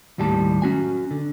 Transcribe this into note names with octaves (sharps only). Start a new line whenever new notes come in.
D#2 A2 G3 G4 A5
C#4 F#4 G#5
D3